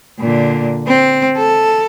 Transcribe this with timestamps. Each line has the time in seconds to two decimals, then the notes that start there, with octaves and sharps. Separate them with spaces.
0.20 A#2 D3
0.88 C4
1.37 A4